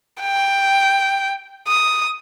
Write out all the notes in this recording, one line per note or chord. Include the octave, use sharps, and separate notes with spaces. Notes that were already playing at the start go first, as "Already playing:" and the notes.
G5
D#6